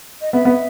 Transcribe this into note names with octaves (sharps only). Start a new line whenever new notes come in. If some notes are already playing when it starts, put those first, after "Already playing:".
D#5
B3 E5
B3